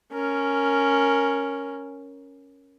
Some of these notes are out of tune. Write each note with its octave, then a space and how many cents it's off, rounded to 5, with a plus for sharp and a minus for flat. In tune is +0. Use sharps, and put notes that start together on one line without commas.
C#4 +0 A#4 +0